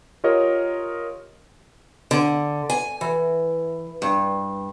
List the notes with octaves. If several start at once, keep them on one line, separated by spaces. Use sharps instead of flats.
F4 G4 A#4 C#5 D#5
D3
G#5
E3
G2